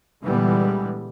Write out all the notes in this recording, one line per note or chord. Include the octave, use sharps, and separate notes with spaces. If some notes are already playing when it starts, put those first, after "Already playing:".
A#2 D3 E3 G3 G#3 B3